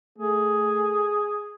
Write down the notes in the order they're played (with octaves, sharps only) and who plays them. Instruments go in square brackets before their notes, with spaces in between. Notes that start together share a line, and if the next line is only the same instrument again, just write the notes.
[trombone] A3 [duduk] G#4